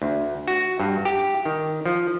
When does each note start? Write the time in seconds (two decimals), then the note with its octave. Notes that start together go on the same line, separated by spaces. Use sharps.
0.02 D2
0.48 F#4
0.80 G2
1.05 G4
1.45 D#3
1.86 F3